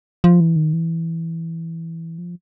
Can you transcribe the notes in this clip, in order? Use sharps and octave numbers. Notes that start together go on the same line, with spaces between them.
F3
E3
D#3
E3
F3